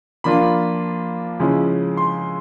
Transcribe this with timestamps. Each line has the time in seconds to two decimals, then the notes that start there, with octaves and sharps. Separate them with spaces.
0.24 F3 A#3 D4 F4 B5
1.40 C#3 F3 G#3 C#4 E4
1.97 C6